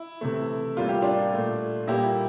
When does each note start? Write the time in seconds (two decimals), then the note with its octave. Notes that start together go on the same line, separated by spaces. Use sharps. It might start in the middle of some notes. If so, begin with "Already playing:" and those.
Already playing: E4
0.21 C3 E3 A3
0.76 A2 G3 A#3 F4
0.89 G4
1.02 D4 F4
1.33 A#2 A3
1.87 A#2 G3 A#3 E4 G4